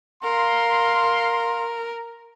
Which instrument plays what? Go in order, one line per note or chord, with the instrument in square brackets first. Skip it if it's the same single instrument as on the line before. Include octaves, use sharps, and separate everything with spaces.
[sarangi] A#4 [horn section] F5 C6